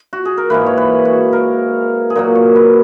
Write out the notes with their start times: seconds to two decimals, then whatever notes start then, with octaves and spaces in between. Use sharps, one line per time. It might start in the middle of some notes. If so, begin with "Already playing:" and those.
Already playing: E4
0.13 F#4
0.25 G#4
0.37 A#4
0.50 G#2 E3 A#3 B4
0.66 C#5
0.77 B4
1.05 F#4
1.33 A#4
2.10 G#4
2.15 A#2 F#3 A#3 A#4
2.35 C#5
2.56 B4